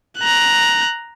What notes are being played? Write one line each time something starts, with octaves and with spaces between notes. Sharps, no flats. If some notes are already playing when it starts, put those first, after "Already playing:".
A#5 F#6